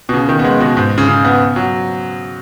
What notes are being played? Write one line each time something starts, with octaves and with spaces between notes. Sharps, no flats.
B2
C#3
D#3
B3
G#3
B2
G#2
C#3
C#3
B3
F#3